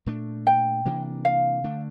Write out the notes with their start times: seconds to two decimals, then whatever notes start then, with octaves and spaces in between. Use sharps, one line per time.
0.06 A#2 A3 D4
0.47 G5
0.85 C3 E3 A#3 D4
1.25 F5
1.64 D3 A3 D4